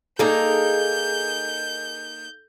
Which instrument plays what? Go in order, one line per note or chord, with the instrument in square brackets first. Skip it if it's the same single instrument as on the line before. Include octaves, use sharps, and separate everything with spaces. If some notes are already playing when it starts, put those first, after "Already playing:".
[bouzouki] A#3 D#4 G#4 [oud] A4 [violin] G6